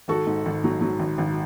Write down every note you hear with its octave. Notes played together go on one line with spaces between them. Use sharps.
G#1 F#4 A4
G#2
G#1
F#3
F#3
G#1
G#1